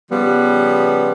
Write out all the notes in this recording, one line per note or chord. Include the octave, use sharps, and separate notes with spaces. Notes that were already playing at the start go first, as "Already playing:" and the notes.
C#3 F3 G3 B3